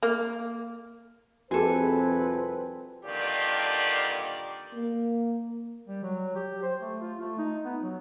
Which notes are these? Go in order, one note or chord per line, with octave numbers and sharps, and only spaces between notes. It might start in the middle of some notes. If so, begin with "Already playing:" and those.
A#3
C2 F2 C4 F#4 G#4 A4 B4 G#5
G2 A#2 D3 D#3 G4 D5
A#3
G3
F#3
G4
C5
A3
F4
A3
D#4
B3
F#3